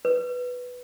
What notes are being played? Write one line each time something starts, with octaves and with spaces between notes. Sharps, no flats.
B4